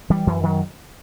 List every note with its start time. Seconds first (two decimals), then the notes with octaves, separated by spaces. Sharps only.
0.10 E3 G3
0.27 F#2 E3
0.43 D#3 F#3